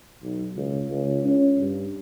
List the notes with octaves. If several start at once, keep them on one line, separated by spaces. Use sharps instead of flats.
B1
C#2
C#2
C#4
G2